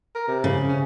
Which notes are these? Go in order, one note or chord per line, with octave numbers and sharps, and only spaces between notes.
A#4
C3
C#3
C#4